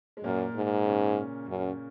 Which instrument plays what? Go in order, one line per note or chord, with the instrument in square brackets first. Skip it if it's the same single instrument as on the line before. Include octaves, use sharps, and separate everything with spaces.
[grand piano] G#3
[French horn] F#2 [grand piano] A#2 A#3
[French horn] G#2
[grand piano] C#3 C#4
[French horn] F#2